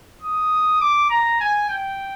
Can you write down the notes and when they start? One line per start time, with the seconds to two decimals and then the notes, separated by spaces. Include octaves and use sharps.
0.22 D#6
0.81 D6
1.10 A#5
1.40 G#5
1.69 G5